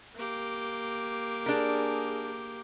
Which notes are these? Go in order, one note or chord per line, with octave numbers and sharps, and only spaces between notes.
A#3 G4
D4 G#4 A#4